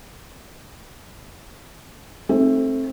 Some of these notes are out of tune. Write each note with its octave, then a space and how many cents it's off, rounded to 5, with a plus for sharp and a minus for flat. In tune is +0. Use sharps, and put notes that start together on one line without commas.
A3 +0 C4 +20 D#4 +0